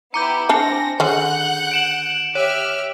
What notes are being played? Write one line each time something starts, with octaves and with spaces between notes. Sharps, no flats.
B3 E4 G4 A#5 D6 G6 C#7
C4 D4 G#5 A5 A#6
D3 D#3 C#4 F#5 F#6 G6
D7 E7 F#7
G4 C#5 E5 F6